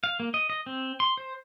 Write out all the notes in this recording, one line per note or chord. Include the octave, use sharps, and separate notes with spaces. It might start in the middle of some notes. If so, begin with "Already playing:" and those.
F5
A#3
D#5
D#5
C4
C6
C5